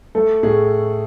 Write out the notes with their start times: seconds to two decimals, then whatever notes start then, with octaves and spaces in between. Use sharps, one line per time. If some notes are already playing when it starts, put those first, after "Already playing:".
0.15 A3 A4
0.43 A2 G#4